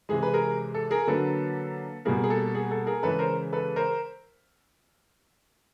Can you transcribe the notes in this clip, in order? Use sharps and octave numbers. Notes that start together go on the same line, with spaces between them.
C3 E3 G#3 G#4
B4
G#4 A#4
A4
G#4 A#4
D3 F#3 A#3 A4 B4
B2 G3 A#3 G#4 A#4
G#4
A4
G#4
A4
G#4 A#4
C#3 E3 G#3 A4 B4
A#4 C5
A4 B4
A#4 C5